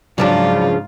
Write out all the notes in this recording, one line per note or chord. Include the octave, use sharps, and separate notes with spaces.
G#2 C#3 F3 F#3 D4 F4 D5 D6